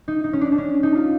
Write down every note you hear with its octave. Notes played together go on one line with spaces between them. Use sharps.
D#4
D#4
C#4
D4
D4
C#4
D#4
F4